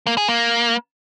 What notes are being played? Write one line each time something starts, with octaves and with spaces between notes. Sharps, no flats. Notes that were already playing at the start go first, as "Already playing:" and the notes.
A#3
G#4
A#3